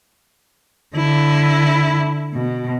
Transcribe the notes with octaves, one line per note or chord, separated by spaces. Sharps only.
D3 E4
B2